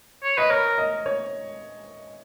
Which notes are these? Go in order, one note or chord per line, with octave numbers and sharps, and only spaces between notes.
C#5
B4 D#5
A#4 C#5
D#5
C#5